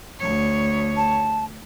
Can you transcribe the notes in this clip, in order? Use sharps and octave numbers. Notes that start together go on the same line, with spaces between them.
D2 C#5
A5